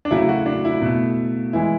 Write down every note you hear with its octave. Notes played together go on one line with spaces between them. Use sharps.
D4
C#3 F#3 A3 E4
F#4
D4
E4
B2 A3
E3 G#3 E4